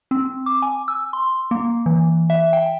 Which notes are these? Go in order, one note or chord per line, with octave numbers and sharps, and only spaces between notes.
C4
D6
G#5
E6
C6
A#3
E3
E5
G5